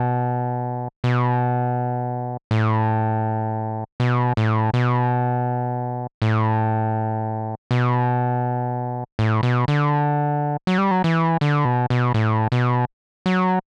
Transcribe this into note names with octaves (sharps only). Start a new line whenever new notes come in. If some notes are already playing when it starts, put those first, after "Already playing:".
Already playing: B2
B2
A2
B2
A2
B2
A2
B2
A2
B2
D3
F#3
G3
F#3
E3
D3
B2
B2
A2
B2
F#3